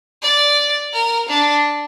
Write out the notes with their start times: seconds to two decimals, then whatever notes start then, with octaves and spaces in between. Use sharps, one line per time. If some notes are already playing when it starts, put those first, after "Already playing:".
0.23 D5
0.93 A#4
1.29 D4